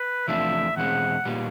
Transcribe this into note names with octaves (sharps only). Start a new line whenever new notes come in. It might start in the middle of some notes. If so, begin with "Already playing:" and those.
Already playing: B4
E2 C3 F3 A3 D4 E5
E2 B2 G#3 C4 F#5
A#2 G3 B3